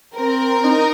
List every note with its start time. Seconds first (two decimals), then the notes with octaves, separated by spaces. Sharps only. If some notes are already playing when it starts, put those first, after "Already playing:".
0.15 C4 A#4
0.64 D#4